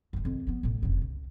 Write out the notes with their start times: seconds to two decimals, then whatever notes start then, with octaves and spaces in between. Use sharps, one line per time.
0.13 F#1 G#3
0.25 F2 D#3
0.47 F3 B3
0.63 A1 A2
0.83 F1 C#3
1.02 C#2